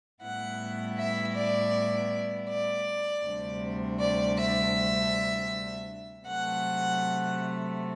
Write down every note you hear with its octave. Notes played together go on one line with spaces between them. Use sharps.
A2 G3 B3 E4 F#5
E5
D5
D5
D2 C3 G3 D4
D5
E5
C3 F#3 A3 F#5